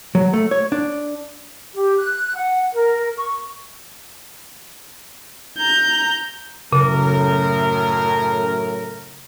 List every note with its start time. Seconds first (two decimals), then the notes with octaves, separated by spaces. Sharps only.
0.15 F#3
0.33 A3
0.51 C#5
0.72 D4
1.75 G4
1.98 F#6
2.36 F#5
2.73 A#4
3.18 C#6
5.58 A#5 G6
6.73 F#2 A2 C#3 A#4